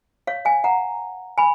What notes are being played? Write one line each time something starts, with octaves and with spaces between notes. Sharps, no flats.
C#5 F5
F5 G#5
F#5 A#5
G#5 B5